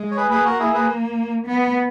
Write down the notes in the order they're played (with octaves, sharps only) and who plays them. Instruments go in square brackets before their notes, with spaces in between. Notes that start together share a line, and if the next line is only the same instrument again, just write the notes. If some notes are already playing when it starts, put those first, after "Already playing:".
Already playing: [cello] G#3
[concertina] C#5
G#4 B4
[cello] A#3 [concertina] G#4 B4
[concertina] F#4 A#4
E4 G#4
G#4 B4
[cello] B3